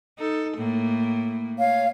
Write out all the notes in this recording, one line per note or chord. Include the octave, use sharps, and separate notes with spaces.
D#4 A4
A2 A#3
C#5 F5